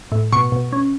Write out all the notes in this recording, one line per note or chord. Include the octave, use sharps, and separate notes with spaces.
A2
B2 C#6
B2
C#4